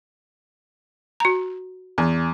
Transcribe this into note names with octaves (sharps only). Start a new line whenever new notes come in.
F#4 A#5
E2